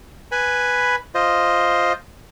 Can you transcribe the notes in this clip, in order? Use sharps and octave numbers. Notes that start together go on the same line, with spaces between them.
B4 G#5 B5
F4 C5 D#5